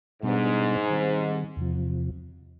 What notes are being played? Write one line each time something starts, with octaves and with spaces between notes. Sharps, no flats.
G#2 B2 G3 B3 D4
D#3 G3 C4
E2 C3 F3